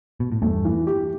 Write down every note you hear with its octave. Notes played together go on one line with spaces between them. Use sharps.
B2
A2
E2 G2 A3
E3
G4